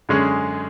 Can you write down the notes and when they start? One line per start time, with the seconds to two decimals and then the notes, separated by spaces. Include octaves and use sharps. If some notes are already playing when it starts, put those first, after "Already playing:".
0.09 F#2 D3 G#3 C#4 G#4